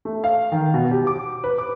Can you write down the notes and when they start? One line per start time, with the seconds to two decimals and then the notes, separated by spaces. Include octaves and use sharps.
0.05 A3
0.24 F5
0.52 D#3
0.74 B2
0.91 G4
1.07 D6
1.44 B4
1.58 D6